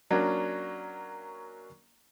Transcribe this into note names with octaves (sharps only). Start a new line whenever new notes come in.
F#3 A#3 C#4 D4